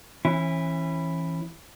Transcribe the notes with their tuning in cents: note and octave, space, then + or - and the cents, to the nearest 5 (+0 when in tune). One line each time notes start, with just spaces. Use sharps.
E3 +0 C#4 -35 E4 +0